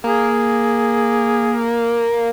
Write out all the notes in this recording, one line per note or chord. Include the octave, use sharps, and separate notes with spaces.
A#3 G#4